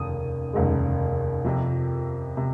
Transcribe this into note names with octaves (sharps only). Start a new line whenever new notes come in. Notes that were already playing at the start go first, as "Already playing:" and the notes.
Already playing: F1 D#2 C#3 D#6
F1 D#2 C#3 G#3
F2 C3 F3
C3